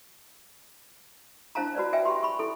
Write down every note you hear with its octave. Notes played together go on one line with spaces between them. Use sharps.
D4 E4 C5 F5 A5 A#5
F#4 B4 C5 D5
B4 E5 G5 G#5
G4 B5 C6
B5 C#6
E4 A4